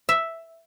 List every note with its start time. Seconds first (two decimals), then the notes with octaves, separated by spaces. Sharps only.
0.09 E5